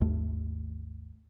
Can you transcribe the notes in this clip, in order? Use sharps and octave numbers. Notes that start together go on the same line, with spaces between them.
G#1 D#2 A3